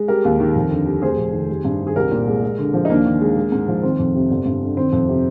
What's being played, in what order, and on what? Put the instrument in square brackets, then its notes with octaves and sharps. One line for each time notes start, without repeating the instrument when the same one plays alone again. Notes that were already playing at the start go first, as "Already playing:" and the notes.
Already playing: [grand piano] G#3
G3 G4 A#4
D#2
D#3
F2
D3
G3
F1 G#4 C5
F2
D#3
G3
G2
D#3
G#4
C2 G4 A#4
A#2
G#3
G#3
D3
F3
D#4
D#2 A#3 D4
D#3
G#3
G#3
G#2
F3
D#3 C4
F2
C3
G1
G2
D3
D#3 C4
F2
C3